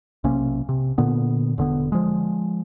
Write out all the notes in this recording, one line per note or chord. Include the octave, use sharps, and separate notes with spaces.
B1 C3 A#3 C#4
C3
A#2 D3 B3
E1 D3 B3
F3 G#3